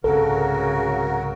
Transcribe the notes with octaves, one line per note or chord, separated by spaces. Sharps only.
C2 G#2 C#3 F#3 C4 F#4 A4 A#4